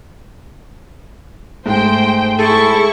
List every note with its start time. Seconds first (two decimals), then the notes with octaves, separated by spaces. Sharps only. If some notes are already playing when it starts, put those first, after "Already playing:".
1.65 G#2 G#3 A3 C5 G5
2.39 E4 G#4 A4 C#6